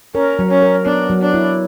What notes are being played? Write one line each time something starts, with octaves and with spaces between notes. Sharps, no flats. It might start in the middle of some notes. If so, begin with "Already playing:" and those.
C#4 A#4
F#3
C#4
A#4
B3 D4
F#3
D4
E4